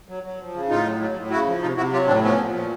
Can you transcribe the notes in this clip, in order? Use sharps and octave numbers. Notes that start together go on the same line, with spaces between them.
F#3
F#3
F3
C#3
A2 D#4 F4
F#3
F#3
A2
C#3 E4 F#4
F3
C3 D#4 F4
C3 E4 F#4
F#3 F4 G4
A2 C4 D4
F3 B3 C#4
A#2
F3